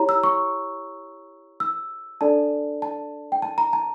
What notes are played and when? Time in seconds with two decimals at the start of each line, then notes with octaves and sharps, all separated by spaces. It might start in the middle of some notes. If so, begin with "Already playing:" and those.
Already playing: E4 G4 C#5 A#5
0.09 E6
0.23 C#6
1.60 E6
2.21 D4 A4 D5 A5
2.82 A5
3.32 G5
3.42 A5
3.58 A#5
3.73 A5